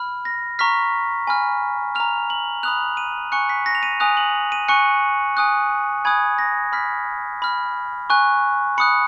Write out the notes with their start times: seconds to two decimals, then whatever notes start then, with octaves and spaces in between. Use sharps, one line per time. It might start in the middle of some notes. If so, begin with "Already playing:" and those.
Already playing: B5 F6
0.25 A#6
0.59 A#5 C#6 F6 B6
1.27 G#5 B5 F6
1.95 A#5 F6 F7
2.30 F#7
2.63 B5 D#6 F#6 F7
2.97 D#7
3.32 G#5 C#6 F#6 C#7
3.49 B6
3.66 A#6
3.75 F7
3.83 D#7
4.00 G#5 D#6 F#6 F7
4.17 F#7
4.52 D#7
4.68 G#5 C#6 F#6 C#7
5.37 G#5 D#6 F#6
6.05 G#5 B5 D#6 F#6 G#6
6.39 A#6
6.73 B5 F6 B6
7.42 B5 F6
8.10 G#5 C#6 F#6
8.78 B5 D#6 F#6 C#7